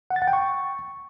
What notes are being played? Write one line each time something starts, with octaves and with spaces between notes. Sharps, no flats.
F#5
A6
F#5
G5
C#6